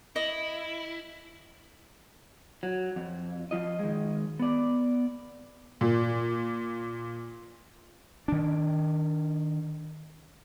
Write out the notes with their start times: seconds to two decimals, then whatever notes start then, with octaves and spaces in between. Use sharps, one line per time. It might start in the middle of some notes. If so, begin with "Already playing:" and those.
0.16 E4 D#5
2.63 F#3
2.96 F2
3.51 F3 F4 D#5
3.79 D#3 G#3
4.39 B3 D5
5.81 A#2
8.28 D#3 D4